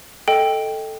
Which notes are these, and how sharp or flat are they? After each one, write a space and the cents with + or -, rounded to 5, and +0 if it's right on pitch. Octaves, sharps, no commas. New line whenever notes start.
A4 +0 D#5 +15 G5 +0